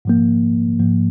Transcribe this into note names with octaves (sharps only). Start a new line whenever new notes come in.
G#2 F3 A#3
G#2 F3 A#3